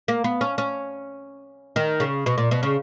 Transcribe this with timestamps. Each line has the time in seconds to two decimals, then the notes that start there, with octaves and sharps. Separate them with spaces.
0.08 A#3
0.24 B3
0.41 C#4
0.58 C#4
1.76 D#3
2.00 C#3
2.26 B2
2.38 A#2
2.51 B2
2.63 C#3